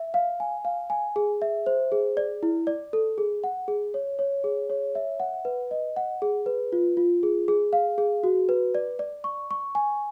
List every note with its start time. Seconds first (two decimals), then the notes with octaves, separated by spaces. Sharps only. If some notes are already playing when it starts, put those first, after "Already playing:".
Already playing: E5
0.14 F5
0.40 G#5
0.65 F5
0.90 G#5
1.16 G#4
1.42 E5
1.66 C5
1.92 G#4
2.17 D5
2.43 E4
2.67 D5
2.93 A4
3.18 G#4
3.44 F#5
3.68 G#4
3.94 C#5
4.19 C#5
4.44 G#4
4.70 C#5
4.95 E5
5.20 F#5
5.45 B4
5.71 D#5
5.96 F#5
6.22 G#4
6.46 B4
6.72 F4
6.97 F4
7.23 G#4
7.48 G#4
7.73 F5
7.98 G#4
8.23 F#4
8.49 B4
8.75 D5
8.99 D5
9.24 C#6
9.51 C#6
9.75 G#5